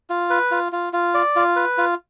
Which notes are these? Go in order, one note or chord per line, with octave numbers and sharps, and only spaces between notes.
F4
B4
F4
F4
F4
D5
F4
B4
F4